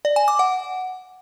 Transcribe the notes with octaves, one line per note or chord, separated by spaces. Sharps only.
D5
G#5
D6
F#5